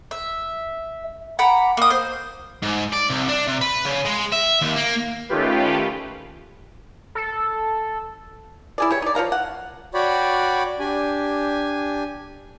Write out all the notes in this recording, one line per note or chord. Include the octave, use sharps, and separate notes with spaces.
E5
F#5 A#5 B5 D6
A#3 D#6
C5
G#2
D5
C2
D4
C3
B4
C#3
G#3
E5
D#2
A#3
D#3 A3 C#4 F4 G4 B4
A4
E4 G#4 D5
G3 C#5
D#4 D5
F3 C#5 F5 A#5
F#5
F#4 C#5 D5 G5 B5
D4 G4 G#5